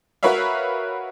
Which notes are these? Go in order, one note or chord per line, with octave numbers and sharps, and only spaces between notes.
F#4 A#4 B4 C#5 E5 F5